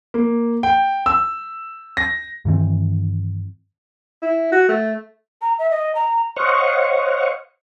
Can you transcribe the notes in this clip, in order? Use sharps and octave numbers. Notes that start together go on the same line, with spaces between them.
A#3
G5
E6
A#6
G2 D#3 E3 C4
E4
F#4
A3
A#5
E5
D#5
A#5
C5 C#5 D#5 F5 F#5 C#6